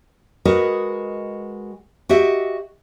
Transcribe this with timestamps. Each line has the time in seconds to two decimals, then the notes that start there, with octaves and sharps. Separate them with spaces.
0.45 G#3 F#4 A#4 B4 D#5
2.09 F#4 G4 D#5 E5